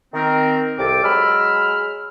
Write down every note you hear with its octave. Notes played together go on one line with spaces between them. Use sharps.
D#3 C4 A#4
C2 G4 A4 D6
F#3 G#3 B5 E6 F6